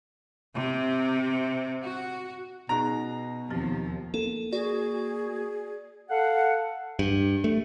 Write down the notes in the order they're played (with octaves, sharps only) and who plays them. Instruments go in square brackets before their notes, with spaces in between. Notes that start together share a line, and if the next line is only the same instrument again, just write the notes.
[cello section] C3
F#4
[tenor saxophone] B2 [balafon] C#4 D#4 G#4 [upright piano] A#5
[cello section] D#2 F3 [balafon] B3 C4 G4
[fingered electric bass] A#3 [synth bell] A4
[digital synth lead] F#4 [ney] G#4 [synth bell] D5
[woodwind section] A4 F5 F#5
[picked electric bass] G2
A3